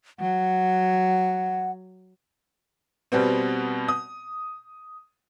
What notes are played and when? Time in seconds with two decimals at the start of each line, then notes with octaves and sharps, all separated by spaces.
0.20 F#3 F#5
3.12 B2 G3 B3 C4
3.88 D#6